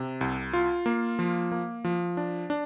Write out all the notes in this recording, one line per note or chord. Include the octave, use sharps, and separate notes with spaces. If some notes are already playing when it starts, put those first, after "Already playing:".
Already playing: C3
C2
F4
A#3
F3
A#3
F3
D4
D4